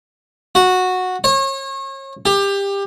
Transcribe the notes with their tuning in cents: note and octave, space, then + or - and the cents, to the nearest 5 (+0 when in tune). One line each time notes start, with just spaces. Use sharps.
F#4 -10
C#5 -35
G4 +20